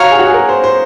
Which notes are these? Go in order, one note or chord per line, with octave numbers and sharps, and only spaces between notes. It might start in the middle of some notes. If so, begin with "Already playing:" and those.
Already playing: F#4 C#5 F5 A#5
G#4
F#4
G#4
A#4
C5
C5